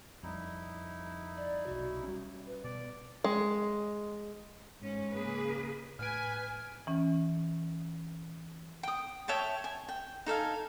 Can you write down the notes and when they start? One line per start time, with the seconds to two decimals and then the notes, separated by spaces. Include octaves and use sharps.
0.23 F2 G3 D#4 E4
1.36 D5
1.67 B1 C3 F#4
2.03 G3 C#4
2.46 B4
2.64 B2 D5
3.24 G#3
4.81 G#2 C#4
5.14 C#3 A#3 G#4 B4
5.99 A2 B4 G#5 F6 D7
6.87 E3 C#4
8.83 G5 D#6
9.28 C#5 E5 G5 A5
9.64 G#5
9.89 G5
10.26 D#4 A4 F5 G#5